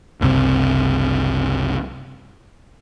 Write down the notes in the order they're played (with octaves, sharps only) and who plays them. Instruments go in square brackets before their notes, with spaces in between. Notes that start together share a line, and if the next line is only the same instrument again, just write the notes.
[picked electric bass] F#1 C2 C3